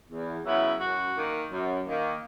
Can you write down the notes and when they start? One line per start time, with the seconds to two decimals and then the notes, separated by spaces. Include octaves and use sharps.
0.09 E2
0.44 C#3 F#3 B3 E4
0.79 F#2 F#4
1.14 D#3 A#3
1.50 F#2
1.85 D#3 A#3